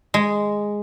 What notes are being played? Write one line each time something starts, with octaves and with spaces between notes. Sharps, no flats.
G#3